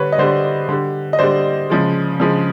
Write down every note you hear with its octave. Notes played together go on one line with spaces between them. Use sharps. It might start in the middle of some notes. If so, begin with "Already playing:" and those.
Already playing: D3 G3 B4 C#5
D#5
D3 G3 C5 D5
D3 G3
D#5
D3 G3 C5 D5
C#3 F3 G#3
C#3 F3 G#3